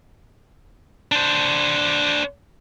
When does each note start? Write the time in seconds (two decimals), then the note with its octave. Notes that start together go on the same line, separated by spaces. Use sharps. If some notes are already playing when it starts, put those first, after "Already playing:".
1.12 D4 C5